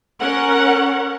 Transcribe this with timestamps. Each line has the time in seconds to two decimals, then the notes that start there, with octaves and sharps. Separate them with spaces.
0.20 C#4 A#4 F#5